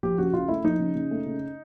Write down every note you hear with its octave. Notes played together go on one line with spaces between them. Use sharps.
F3 G4
C#3 F#4
C#3 F4
A3 E4
F3 D#4
C#3
C#3
A3
C#3